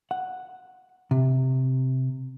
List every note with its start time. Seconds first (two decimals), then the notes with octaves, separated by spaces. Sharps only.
0.11 F#5
1.11 C3